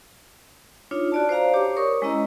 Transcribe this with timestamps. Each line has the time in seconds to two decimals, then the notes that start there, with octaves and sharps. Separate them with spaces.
0.91 D4 D#4 F4 C#5
1.12 F#4 D5 A5
1.29 C5 D5 F5 A#5
1.54 G4 C#5 D6
1.77 A#4 C#5 C#6 D#6
2.02 G#3 C#4 E4 D#5 A#5 E6